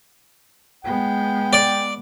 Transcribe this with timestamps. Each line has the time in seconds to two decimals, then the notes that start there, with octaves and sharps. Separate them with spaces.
0.85 G#3 B3 G5
1.53 D5